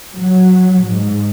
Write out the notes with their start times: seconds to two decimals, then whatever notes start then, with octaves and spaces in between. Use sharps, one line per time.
0.17 F#3
0.84 G#2